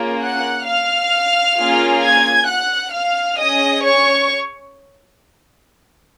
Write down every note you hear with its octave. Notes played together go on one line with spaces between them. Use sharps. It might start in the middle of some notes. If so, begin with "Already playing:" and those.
Already playing: A#3 C#4 F4 G#4
F#5 F#6
F5 F6
A#3 C#4 F4 G#4
G#5 G#6
F#5 F#6
F5 F6
C#4 G#4 D#5 D#6
C#5 C#6